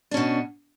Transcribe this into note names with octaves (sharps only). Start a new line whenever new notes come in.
B2 C#4 D4